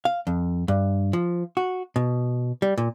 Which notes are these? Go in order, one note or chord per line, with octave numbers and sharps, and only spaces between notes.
F5
F2
G2
F3
F#4
B2
G3
A#2